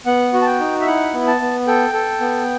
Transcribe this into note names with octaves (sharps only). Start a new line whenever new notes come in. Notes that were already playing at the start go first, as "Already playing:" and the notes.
B3 F#5
F#4
A5
G5
D#4
E5
E4 F#5
B3
A5
B3
A4 G5
A4
B3